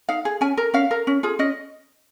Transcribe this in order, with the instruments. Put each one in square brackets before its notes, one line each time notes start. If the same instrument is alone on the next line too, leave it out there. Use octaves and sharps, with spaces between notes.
[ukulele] D#4 F5
G#4
C#4 G#5
A#4
C#4 F5
A#4
C#4
F4 G#4
C#4 D#5